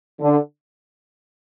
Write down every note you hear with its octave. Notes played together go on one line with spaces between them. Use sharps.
D3